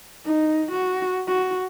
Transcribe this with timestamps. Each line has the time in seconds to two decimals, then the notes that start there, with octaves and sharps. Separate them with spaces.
0.25 D#4
0.71 F#4
1.28 F#4